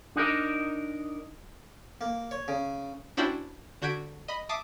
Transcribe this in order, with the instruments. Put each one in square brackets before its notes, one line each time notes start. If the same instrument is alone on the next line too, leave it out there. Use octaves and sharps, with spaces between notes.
[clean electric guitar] D4 D#4 F#4 A#4 D#5
[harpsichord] A#3
C#5
C#3
[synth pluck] C#4 D4 E4 F#4 C5 G5
D3 F#4 G6 G#6 B6 D7
D#5 B5 B6
E5 A5 D6 D#6 C7 E7